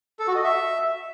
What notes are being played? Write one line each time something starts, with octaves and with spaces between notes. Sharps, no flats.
A4
F#4
D#5
E5